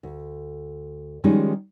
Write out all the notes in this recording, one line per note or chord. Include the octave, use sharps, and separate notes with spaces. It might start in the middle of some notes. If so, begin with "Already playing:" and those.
D2
D#3 F3 G3 G#3 C#4 D#4